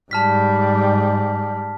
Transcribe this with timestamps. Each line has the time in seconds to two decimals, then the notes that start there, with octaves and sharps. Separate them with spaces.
0.11 G#2 G3 A5 F6 B6